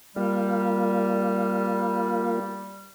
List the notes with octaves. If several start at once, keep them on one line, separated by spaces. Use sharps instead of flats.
G3 A#3 F4